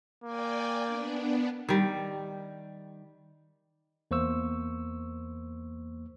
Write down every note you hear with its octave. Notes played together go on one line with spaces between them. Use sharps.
A#3 D5 G5 G#5
B3 D4
D#3 G3
E2 A#3 C5 C#6 E6